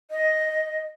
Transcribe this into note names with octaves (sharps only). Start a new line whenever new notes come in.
D#5